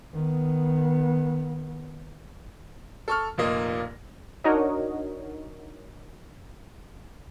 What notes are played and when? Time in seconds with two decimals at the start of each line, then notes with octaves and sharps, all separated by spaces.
0.14 D#3 B3
3.08 A4 C#6 F6
3.38 F1 A#2 A#3 D#5
4.44 D4 D#4 F#4 A#4 C#5 D#5